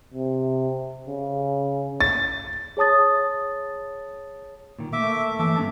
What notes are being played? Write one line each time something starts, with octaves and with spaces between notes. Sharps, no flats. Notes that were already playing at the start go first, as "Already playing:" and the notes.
C3
C#3
A6
G#4 C#5 A5 D#6 A6
A#2 D#3
A3 A#3 E5 D6
E3 A#3 A4 E5 D6
G2 C#4 A5